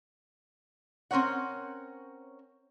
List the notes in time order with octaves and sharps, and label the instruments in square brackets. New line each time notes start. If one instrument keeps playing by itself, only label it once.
[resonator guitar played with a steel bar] C4 C#4 A#4 C#5 F#5